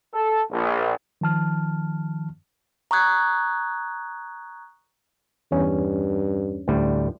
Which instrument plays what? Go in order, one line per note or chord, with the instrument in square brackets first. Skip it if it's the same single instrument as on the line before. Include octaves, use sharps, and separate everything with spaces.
[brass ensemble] A4
A#1
[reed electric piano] D#3 F3 A5 F6
[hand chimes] A#5 C#6 D#6 F#6 G#6
[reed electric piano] E2 C#4 [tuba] G2
[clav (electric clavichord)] D2 A2 G3